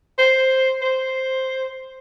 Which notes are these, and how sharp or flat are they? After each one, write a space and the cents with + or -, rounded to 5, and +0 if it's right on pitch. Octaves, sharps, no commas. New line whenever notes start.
C5 +5
C5 +0